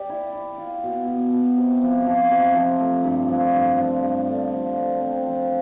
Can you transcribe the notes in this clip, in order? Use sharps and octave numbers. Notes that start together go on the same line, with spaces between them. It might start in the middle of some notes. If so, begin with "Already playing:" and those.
Already playing: G4 D5
E4
E4
F4
B2
B2
B2
C3
F3
F3
C3
F3
A3
G2
F3
G2
F3
G2
D3
F3
F3
C4
F3